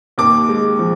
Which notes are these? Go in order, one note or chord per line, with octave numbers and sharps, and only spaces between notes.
D#2 D6
G#3
F3